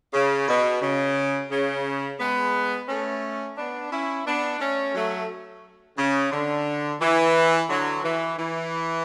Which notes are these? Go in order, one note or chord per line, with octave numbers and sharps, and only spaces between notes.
C#3
B2
C#3
C#3
G#3 B3
A3 C#4
B3 D4
C#4 E4
B3 D4
A3 C#4
F#3 A3
C#3
D3
E3
D3 F#3
E3
E3